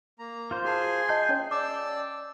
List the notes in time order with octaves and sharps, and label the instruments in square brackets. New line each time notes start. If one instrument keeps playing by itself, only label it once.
[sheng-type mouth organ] A#3 A#5
[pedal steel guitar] F4 C5
[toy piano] F#4 A5 [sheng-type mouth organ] G#4 G#5 C6
[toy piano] D#5 A5 [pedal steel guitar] G6
[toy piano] C#4 C#5
[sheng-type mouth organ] D5 A5 E6 [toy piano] D6